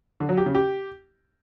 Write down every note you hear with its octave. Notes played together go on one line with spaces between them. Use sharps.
D3
F#3
G4
C#3
G4